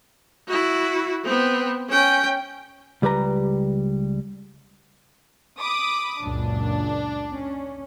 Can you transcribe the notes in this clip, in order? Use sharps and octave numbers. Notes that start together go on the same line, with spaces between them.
E4 F#4
B3 C4
C#4 G5
C#2 G3 G4 B4 A#5
B5 D6 D#6
C#2 F#2 A#2 D4
C#4